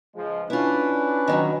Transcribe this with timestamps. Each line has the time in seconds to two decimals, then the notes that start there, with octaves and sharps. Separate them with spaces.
0.15 C#2 F3 G#3
0.50 C#4 D4 E4 F4 B4
1.27 D#3 E3 F#3